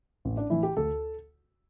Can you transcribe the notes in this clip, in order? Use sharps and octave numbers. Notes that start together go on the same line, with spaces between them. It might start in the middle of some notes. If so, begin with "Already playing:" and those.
A1
D4
A2 E3 E4
G4
D2 A4